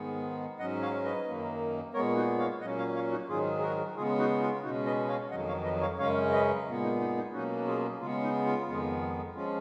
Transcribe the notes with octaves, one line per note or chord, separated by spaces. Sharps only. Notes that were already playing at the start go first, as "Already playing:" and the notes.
Already playing: G#2 D#3 G#3 B3
G#2 F#3 C#4 D#5 F#5
C#5 F5
B4 D#5
F#2 D#3 F#3 A#3
A#2 G#3 B3 A#4 C#5
D#4 F#4
C#5 F5
A#2 F#3 C#4 D#5 F#5
C#5 F5
C#5 F5
D#4 F#4
G#2 D#3 F#3 F4 G#4
G#4
F#4 A#4
C#3 G#3 B3 F4 G#4
D#4 F#4
F4
B2 G#3 C#4 D#4 F#4
B4 D#5
C#5 F5
F2 D#3 F#3 D#5 F#5
C#5 F5
B4 D#5
C#5 F5
F#2 C#3 G#3 C#4 C#5 F5
B4 D#5
A#2 G#3 B3
D#4
D#4
D#4
B2 F#3 A#3 C#4 D#4 F#4
F4 G#4
C#3 G#3 B3 F4
D#4
F4
F2 D#3 G#3 B3
F3 G#3 C#4 F4